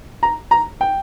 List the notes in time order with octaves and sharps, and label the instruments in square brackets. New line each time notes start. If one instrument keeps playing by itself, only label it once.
[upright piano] A#5
A#5
G5